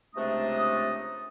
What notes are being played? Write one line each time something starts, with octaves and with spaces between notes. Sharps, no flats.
C#2 C3 A3 D4 A#5 D#6